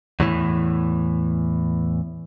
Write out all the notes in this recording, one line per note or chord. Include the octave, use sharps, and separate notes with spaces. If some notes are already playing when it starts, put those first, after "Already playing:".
E2 A2 E3